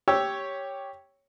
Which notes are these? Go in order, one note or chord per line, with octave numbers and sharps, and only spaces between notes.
G4 C#5 E6